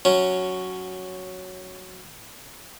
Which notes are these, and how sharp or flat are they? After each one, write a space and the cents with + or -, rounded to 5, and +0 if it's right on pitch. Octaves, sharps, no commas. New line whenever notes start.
F#3 +0 C#4 +0